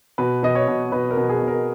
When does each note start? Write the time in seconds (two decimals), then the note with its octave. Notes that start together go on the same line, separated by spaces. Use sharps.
0.18 B2 B4
0.43 B2 D#5
0.55 C#5
0.68 B2
0.92 B2 B4
1.11 A#4
1.17 B2
1.29 G#4
1.42 B2
1.48 A#4